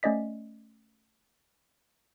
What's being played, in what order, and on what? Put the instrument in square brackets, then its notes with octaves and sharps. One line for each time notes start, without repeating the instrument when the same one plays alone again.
[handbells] A3 C#4 D5 D#5 B6